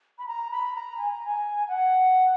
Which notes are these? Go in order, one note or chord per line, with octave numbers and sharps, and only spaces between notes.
B5
A#5
B5
A#5
G#5
A#5
G#5
F#5